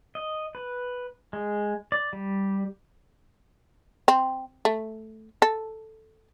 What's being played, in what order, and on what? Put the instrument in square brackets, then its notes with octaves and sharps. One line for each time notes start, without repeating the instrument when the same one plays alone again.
[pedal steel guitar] D#5
B4
G#3
D5
G3
[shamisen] C4
A3
A4